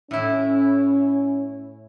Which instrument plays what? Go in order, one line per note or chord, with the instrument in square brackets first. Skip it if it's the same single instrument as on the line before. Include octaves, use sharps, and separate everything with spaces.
[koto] A2 E4 [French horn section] C#4